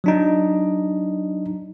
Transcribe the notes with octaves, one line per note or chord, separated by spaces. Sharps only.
F#3 D4 D#4